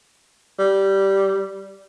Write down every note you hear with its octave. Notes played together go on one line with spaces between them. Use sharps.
G3